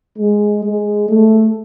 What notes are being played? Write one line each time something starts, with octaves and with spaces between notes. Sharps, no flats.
G#3
G#3
A3